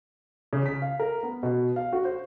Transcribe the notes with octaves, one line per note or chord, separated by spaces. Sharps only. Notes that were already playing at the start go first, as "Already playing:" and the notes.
C#3
B6
F5
A#4
B3
B2
F5
F#4
C5